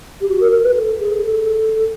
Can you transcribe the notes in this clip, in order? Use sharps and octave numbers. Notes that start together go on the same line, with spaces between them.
G4
F#4
A#4
A#4
B4
A4
G#4
A4